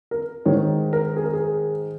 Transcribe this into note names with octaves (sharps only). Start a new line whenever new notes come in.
A#4
G#2 D#3 C#5
A#4
G#4
A#4
G#4